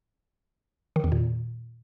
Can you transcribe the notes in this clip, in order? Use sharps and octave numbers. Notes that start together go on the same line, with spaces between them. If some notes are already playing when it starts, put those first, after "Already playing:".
D#3
E2
A#2